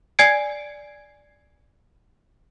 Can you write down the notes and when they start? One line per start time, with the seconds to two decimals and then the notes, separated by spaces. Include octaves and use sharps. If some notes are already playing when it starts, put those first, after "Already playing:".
0.19 D5 G#5 G#6 C7 D7